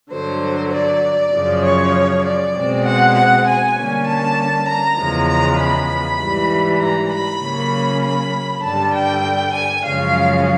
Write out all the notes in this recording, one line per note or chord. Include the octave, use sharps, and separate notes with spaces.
G2 D3 F#3 C5
D5
F#2 C#3 F3
C#5
D5
B2 G#3 C4
F#5
F#5
G#5
D3 G3 A#3 C#4
A5
A#5
E2 C#3 F3 G#3
A#5
B5
G#2 E3 G3
A#5
B5
C#3 F#3 A#3 C#4
B5
G2 D3 G3 A5
G5
G#5
F#2 C#3 F3 G#3 C#4 F5